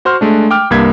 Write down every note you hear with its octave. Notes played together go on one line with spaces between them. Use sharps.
F#4 C5 C6 F6
G#3 A3 D4
G5 D6 F6
C2 G2 A#3 G#6 B6